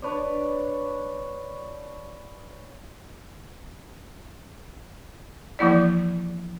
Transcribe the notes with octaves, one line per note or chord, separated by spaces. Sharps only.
D4 B4 C#5 D5
E3 F3 A#3 E4 D5